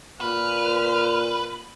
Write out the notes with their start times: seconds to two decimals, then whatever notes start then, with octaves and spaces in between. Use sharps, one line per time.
0.21 A#2 B4 F6